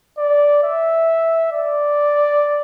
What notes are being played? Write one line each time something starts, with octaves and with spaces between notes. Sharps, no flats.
D5
E5
D5